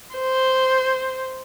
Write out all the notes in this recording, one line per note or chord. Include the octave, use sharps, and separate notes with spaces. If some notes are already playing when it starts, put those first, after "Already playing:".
C5